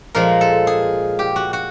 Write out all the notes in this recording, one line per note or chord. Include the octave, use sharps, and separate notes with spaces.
A#2 F3 G#3 A#4
A4
G#4
G4
F#4
F#4